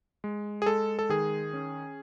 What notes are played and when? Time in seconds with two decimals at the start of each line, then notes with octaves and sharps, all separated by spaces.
0.24 G#3
0.62 G#4
0.66 G#3 A4
0.99 A4
1.09 D#3 G#4
1.53 C#4